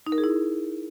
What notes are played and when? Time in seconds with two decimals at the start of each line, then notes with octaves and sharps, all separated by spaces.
0.07 D#4
0.12 A#4
0.18 G#4
0.24 E4